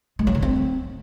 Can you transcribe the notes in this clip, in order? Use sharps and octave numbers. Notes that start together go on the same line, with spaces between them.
G#3
F#3
D3
C4